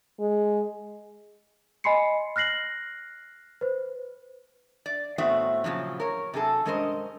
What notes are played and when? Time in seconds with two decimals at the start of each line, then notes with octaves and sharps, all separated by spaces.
0.20 G#3
1.84 D#5 G#5 B5 C6 C7 C#7
2.36 F6 F#6 A#6 C7 F#7
3.61 B4 C5
4.86 D5
5.18 A2 B3 C4 F#4 E5
5.64 A#2 C#3 F3 F#3
6.00 A#4 C#5
6.34 C3 F#3 G#4 A4
6.65 G2 G#3 C#4 A#4 C5 D#5